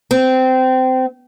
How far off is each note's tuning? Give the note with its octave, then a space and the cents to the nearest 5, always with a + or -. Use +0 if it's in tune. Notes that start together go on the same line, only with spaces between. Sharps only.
C4 -20